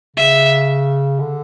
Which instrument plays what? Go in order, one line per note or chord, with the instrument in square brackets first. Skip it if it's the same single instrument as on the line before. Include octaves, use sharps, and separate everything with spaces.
[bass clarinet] C#3 [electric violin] E5
[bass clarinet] D3